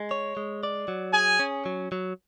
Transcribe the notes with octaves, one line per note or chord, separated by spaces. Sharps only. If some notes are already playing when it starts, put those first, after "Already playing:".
Already playing: G#3
C#5
G#3
D5
F#3
G#4 G#5
C#4
F#3
F#3